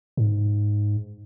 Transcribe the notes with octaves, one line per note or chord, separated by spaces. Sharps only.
G#2